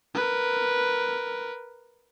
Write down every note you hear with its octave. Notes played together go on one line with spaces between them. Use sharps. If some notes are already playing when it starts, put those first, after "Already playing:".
A#4 B4